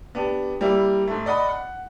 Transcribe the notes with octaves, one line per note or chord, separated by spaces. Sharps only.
B3 D4 G4
G3 A#3 E4
G#2 A3
D5 D#5 F#5 B5
F#5